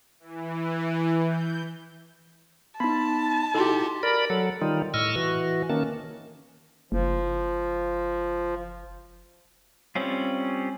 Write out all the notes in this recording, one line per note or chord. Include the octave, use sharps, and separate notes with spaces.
E3
G6
B3 D#4 A5 B5
D#4 E4 F#4 G4 A4 C6
A#4 D5 B5
F#3 A4
D#3 G3 D#4 F4
A2 D#5 C#6 E6 F6
E3 F#4
D#3 A#3 C#4 A5
F#1 F3
G3 C4 C#4 F4